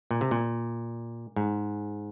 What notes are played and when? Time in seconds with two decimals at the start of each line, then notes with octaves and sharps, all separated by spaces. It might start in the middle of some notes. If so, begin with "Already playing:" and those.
0.11 A#2
0.21 C3
0.31 A#2
1.36 G#2